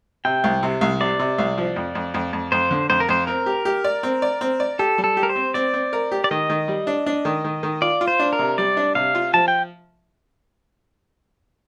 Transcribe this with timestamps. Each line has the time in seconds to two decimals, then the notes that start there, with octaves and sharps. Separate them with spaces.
0.25 C3 G5
0.44 C2
0.63 C3
0.81 C2
1.01 C3 D5
1.19 C3
1.38 C2
1.58 F3
1.76 F2
1.95 F2
2.14 F2
2.33 F2
2.52 F2 C5
2.71 D3
2.90 F2 C5
3.00 A#4
3.09 F2 C5
3.27 C4 A#4
3.46 G4
3.65 G4
3.84 D5
4.03 C4
4.22 D5
4.41 C4
4.60 D5
4.79 G4 A4
4.98 G3
5.04 A4
5.17 G4
5.23 A#4
5.29 C5
5.36 C4
5.54 C4 D5
5.74 C4
5.93 A#4
6.12 G4
6.24 D5
6.31 D#3 D#5
6.50 D#3
6.68 G3
6.87 D4
7.06 D4
7.25 D#3
7.44 D#3
7.63 D#3
7.81 F4 D5
8.01 F4
8.08 C5
8.19 D4
8.33 A#4
8.39 C3
8.58 G3 D5
8.77 D4
8.95 C3 F5
9.15 F4
9.33 F3 A5
9.48 G5